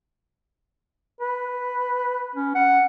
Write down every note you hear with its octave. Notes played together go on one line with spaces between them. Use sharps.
B4
C#4
F#5